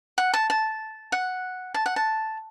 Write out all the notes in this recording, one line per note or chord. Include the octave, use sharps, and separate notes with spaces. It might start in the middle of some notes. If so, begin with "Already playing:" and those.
F#5
A5
A5
F#5
A5
F#5
A5